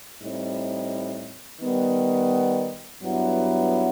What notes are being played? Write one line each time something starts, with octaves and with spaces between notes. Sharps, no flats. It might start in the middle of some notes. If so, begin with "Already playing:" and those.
A2 G3 C4 D#4
D#3 G3 B3
G2 F#3 B3 E4